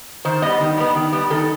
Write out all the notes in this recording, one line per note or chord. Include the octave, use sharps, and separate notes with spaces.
D#3 C5
G3 B3 D#5
D#3
G3 B3
D#3
G3 B3
D#3 A4